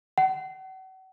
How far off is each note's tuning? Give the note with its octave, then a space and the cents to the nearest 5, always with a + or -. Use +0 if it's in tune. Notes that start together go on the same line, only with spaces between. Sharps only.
F#5 +40